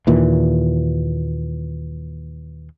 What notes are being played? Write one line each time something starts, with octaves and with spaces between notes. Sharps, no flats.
D#2 A#2 E3